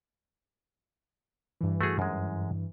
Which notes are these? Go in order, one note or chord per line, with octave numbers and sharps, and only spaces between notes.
G2 E3
A3 F#4 G#4
F#2 G#3